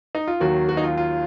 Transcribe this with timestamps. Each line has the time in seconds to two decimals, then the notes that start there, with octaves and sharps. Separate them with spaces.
0.15 D#4
0.27 F4
0.40 D#2 D#3 F#3 F#4
0.69 F#4
0.77 D#4
0.84 F4
0.97 F4